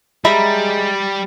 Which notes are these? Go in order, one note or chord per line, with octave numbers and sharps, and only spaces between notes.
G3 G#3 E5 A#5 B5